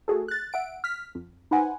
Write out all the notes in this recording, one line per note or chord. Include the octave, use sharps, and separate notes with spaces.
A3 F#4 G#4 A4
F#6 A6
E5 F#5 D7
F6 B6
F2
D#4 B4 C5 F#5 G#5